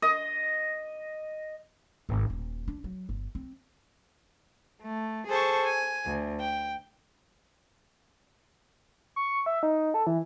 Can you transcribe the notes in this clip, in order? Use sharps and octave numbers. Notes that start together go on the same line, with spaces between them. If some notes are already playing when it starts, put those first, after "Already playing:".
D#5
G#1
D#1
D4
F#3
G1
C4
A3
G#4 A4 C5 A5 C#6
G#5
D2
G5
C#6
E5
D#4
A4
E3